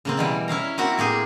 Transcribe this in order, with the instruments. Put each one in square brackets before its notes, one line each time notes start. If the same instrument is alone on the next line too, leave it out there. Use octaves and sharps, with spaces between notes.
[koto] C#3 A#3 C4
B2 E3 G3
C#4 E4 F5 A#5
A#3 C4 E4 F#4 A#4
A2 A#3 G4 G#4